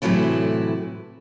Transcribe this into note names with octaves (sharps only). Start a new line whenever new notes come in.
A2 C3 E3 F#3 A3 E4